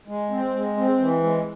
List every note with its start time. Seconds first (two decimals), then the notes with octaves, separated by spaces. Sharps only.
0.08 G#3
0.30 C4
0.54 G#3
0.77 C4
1.00 E3
1.23 G#3